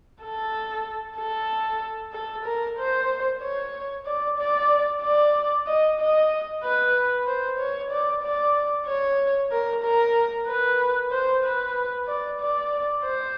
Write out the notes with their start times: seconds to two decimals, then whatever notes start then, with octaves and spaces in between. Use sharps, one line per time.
0.22 A4
1.17 A4
2.13 A4
2.45 A#4
2.78 C5
3.42 C#5
4.06 D5
4.38 D5
5.02 D5
5.67 D#5
5.99 D#5
6.63 B4
7.27 C5
7.59 C#5
7.91 D5
8.23 D5
8.87 C#5
9.51 A#4
9.84 A#4
10.48 B4
11.11 C5
11.43 B4
12.07 D5
12.40 D5
13.04 C5